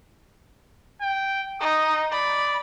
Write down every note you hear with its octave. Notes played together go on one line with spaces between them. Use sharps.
G5
D#4 D#6
D5 B5